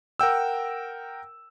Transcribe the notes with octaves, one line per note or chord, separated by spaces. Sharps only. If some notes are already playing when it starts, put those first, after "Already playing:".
A#4 F#5 G5 E6